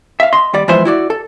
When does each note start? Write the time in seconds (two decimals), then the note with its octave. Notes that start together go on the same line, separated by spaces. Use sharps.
0.20 E5 F5
0.33 D#5 C6
0.54 D#2 G3 D5
0.68 E3 F3 G#3 B3 C5 E5
0.85 E4 F#4 D5
1.10 A4